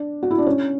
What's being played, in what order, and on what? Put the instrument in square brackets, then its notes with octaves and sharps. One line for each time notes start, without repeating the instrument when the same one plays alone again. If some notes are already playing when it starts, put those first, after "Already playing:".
Already playing: [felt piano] D4
F#4
E4
D4
C#4